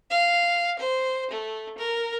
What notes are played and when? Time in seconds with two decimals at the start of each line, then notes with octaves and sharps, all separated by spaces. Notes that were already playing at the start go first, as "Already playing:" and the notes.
0.10 F5
0.79 C5
1.30 A3
1.78 A#4